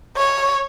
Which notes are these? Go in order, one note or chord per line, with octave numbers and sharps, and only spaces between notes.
C#5